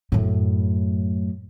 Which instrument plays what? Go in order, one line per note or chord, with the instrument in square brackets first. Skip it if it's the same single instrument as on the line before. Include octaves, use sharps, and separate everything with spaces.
[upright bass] F#2 A2